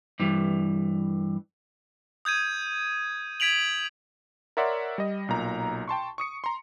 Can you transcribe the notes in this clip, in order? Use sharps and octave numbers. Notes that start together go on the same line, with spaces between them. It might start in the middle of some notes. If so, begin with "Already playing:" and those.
G2 E3
D#6 G6 G#6 D#7
G#6 B6 D7 F7 F#7
A#4 C#5 D5 E5 F#5 C6
G3 D#5
B1 A#2 A#5
G5 A5 C6 C#6
C#6 D#6 C#7
A#5 C6